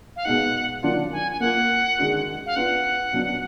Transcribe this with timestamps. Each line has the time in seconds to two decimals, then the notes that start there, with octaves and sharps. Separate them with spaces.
0.16 F5
0.25 B2 G#3 D#4 F#5
0.82 D#3 F#3 D4 F4 F#5
1.12 G#5
1.31 G#5
1.40 A#3 F4 A#4 F#5
1.98 D#3 G#3 D4 F#4
2.46 F5
2.56 B3 D4 F4 B4 F#5
3.13 B2 F#3 D4